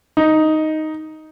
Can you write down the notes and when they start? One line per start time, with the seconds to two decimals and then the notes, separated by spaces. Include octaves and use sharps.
0.17 D#4